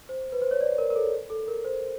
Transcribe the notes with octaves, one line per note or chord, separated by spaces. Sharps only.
C5
B4
C5
C#5
D5
A#4
A#4
A4
A4
A#4
C5